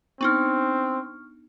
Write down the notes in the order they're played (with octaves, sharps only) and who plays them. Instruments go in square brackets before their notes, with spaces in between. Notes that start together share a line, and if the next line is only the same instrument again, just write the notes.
[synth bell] B3 D4 D#4 [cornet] C4 [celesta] C#6 F6